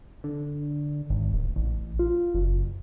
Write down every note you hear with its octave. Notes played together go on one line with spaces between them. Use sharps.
D3
G#1
D1
A1
F4
F#1